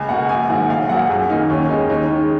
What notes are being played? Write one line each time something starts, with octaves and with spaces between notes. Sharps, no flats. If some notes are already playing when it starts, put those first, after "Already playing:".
Already playing: C#2 G#5
B2 A#3 F#5
A#1 G#5
G#2 D#3 F#3 F#5
B1 F5
A#2 F#3 A#3 F#5
F#2 G#4
D#3 A#3 D#4
D#2 C#4
D#3 G#3 D#4
D#2 D#4
D#3 G#3